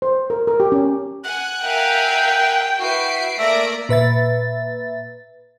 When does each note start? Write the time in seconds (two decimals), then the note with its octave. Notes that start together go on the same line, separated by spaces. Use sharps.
0.02 C5
0.30 A#4
0.47 A#4
0.60 G4
0.72 C#4
1.24 F#5 G#5 F#6
1.63 A#4 E5 F5 G5
2.79 E4 F#4 B4 E5 C7 D7
3.39 A3 A#3 D5 E5 A#6 D7
3.89 A#2 B4 E5 A6